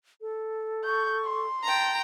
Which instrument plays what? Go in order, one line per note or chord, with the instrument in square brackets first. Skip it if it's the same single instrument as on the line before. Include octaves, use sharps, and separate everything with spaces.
[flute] A4
[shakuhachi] C#6 [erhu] G6
[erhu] C6
[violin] G5 A#5 [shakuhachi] A5